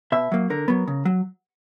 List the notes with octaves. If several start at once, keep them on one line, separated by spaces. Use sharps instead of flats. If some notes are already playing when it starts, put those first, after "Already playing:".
B2 E5
F#3 A#3
D3 A#4
F#3 B3
C#3
F#3